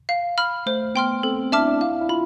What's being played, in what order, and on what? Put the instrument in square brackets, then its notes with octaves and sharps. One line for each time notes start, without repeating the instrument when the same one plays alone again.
[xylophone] F5
B5 F6
[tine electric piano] A3 [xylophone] C5
[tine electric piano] B3 [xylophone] G5 C6 F6
[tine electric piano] C4 [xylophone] A4
[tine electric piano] D4 [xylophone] E5 A5 D6 F6
[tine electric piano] E4
D4
[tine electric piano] E4 [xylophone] F5
[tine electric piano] E4
[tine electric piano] F4 [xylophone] B5